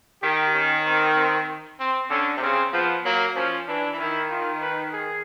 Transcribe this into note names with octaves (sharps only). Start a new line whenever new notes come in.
D#3 G4
C#4
C4
C4
C4
D3 C#4
C3
C#3 C4
F3 B3
F#3 A#3
F3 C#4
E3 D4
E3
D#3 E4
F4
B4
G#4